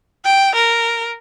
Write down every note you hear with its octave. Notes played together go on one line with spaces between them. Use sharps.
G5
A#4